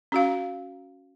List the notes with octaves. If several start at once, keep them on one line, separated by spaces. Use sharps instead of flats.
C#4 F#4 F5